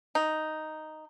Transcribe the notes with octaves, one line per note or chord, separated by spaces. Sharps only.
D#4